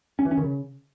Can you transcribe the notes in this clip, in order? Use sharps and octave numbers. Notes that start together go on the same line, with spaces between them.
C#4
E3
C#4
D#3
C#3